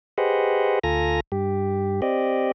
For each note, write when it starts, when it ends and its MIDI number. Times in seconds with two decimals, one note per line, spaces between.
0.18 0.79 67
0.18 0.79 68
0.18 0.79 71
0.18 0.79 72
0.18 0.79 75
0.18 0.79 78
0.84 1.20 38
0.84 1.20 65
0.84 1.20 69
0.84 1.20 80
0.84 1.20 82
0.84 1.20 94
1.32 2.01 43
1.32 2.01 67
2.02 2.51 60
2.02 2.51 67
2.02 2.51 74
2.02 2.51 75